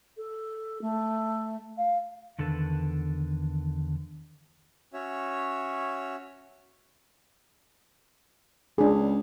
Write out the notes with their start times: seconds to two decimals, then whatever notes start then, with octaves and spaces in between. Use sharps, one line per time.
0.17 A4
0.81 A3
1.77 F5
2.39 E2 D3 D#3 A4 B4
4.93 C#4 F#4 C#5 E5
8.78 C#2 D4 G#4